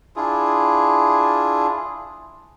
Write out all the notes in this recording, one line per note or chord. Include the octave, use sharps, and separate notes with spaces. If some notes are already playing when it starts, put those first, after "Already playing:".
D4 E4 F4 G#4